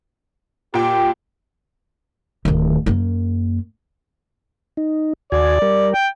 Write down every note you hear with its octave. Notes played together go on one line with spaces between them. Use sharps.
A#2 G4 G5
D1 D#3
F#2 A#3
D#4
D#2 F#4 D5 G#5
G3 A#4
G5